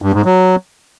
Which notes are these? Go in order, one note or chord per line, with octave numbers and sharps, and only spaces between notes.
G2
G#2
F#3